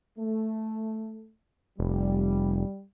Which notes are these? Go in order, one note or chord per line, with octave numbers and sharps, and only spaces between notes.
A3
F1 G3